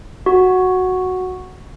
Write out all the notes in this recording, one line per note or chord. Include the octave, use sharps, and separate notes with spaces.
F#4